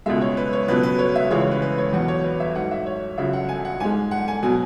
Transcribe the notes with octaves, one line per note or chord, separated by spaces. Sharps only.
C#2 B2 G#3 E5
C#5
B4
C#5
C#2 B2 F#3 B4
B4
C#5
E5
C#2 C#3 E3 G#3 C#5
C#5
B4
B4
C#5
E2 B2 F#3 F#5
C#5
B4
E5
G#2 F#3 F#5
E5
C#5
C#2 C#3 F#3 E5
F#5
G#5
F#5
G#2 G#3 G#5
F#5
G#5
B2 F#3 G#5